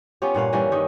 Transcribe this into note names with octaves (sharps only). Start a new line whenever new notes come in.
B3 C#4 F4 G4
G2 A#2 F5 F#5
E3 G3 A#3 C#4
D#3 G4